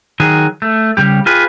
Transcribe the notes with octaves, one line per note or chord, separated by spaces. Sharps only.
D#3 F#3 G#4
A3
C#3 G3 G4
F4 G4 G#4 B4